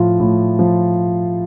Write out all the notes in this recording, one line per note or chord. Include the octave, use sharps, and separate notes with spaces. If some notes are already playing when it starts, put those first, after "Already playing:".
Already playing: A2 F3 F4
A2
F3